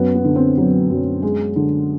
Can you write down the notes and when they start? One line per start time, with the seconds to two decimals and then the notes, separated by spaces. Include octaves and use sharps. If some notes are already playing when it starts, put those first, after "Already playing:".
Already playing: F#2 B3
0.15 B3
0.25 D3
0.36 C4
0.57 F#3 B3
0.90 F#2
1.22 G#3
1.56 D3